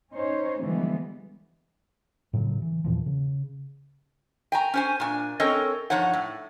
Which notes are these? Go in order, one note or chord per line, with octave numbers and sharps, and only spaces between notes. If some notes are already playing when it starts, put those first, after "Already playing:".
C#4 D#4 C5 C#5
D3 E3 F3 G3 G#3 B3
A2 C#3 E3 F#3
E3
E2 A#2 E3 F3
C#3
G5 G#5 A#5
C#4 C5 G#5
A#2 D4 G#5
C4 C#4 A4 A#4 C#5 D#5
G2 F3 D#4 C#5 F#5
A2